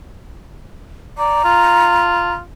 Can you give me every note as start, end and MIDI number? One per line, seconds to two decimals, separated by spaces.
1.18 1.41 74
1.18 2.33 82
1.45 2.41 65